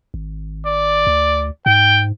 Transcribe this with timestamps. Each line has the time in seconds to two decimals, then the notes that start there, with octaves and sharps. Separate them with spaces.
0.14 G#1
0.66 D5
1.07 D2
1.66 G#2 G5